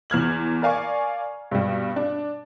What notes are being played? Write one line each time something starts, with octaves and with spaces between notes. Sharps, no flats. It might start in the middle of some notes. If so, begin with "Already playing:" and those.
E2 F6 G#6 F#7
A#4 D5 F5 G#5 C#6
G2 B2 G3
D4